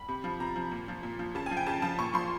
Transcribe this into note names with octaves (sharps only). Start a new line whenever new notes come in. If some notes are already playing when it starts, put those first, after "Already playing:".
Already playing: B5
C3
F3
C3 A#5
F3
A#2
F3
A#2
F3
C#3 A5
F3 G#5
G5
C#3 A5
F3 A5
A#2 C#6
F3 C6